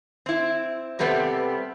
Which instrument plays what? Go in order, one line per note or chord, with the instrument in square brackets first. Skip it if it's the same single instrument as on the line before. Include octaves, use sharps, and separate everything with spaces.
[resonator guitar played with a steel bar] C4 E4
C3 G3 A3 B3 C4